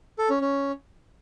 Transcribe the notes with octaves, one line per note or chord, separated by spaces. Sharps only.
A4
C#4
C#4